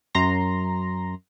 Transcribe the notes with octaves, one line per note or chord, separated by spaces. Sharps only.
F#2 A#5 C6 A#6